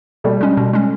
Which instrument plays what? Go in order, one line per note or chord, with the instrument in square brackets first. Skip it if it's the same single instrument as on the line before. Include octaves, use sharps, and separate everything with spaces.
[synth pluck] B2 [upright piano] G3 A3
[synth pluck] G#3 C#4
B2
G#3 C#4